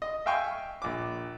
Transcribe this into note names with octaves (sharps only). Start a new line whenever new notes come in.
D#5
E5 F5 G5 G#5 C#6
A#1 D6